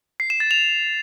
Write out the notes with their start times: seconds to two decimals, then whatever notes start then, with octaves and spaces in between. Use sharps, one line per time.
0.20 C7
0.30 E7
0.40 A6
0.51 F7